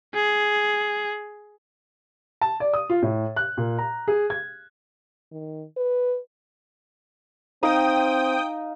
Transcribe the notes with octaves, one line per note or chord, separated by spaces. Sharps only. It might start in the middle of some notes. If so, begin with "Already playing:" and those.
G#4
A5
D5
D#6
F4
A2
F#6
A#2
A#5
G#4
G#6
D#3
B4
C4 D#4 D#5 F5 G5 D#6